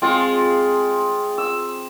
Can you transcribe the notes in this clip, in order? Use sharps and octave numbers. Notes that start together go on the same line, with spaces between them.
G#3 C4 F4
E6